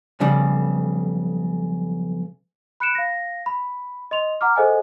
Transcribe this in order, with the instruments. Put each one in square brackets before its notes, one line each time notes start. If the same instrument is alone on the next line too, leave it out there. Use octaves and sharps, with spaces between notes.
[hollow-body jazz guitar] B1 F2 C#3 G3
[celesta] B5 F#6 C#7 D7 E7
F5 A#6
B5
D#5 C6 F7
F#5 A#5 D6 F6
G#4 A4 C5 D#5 F#5 G#5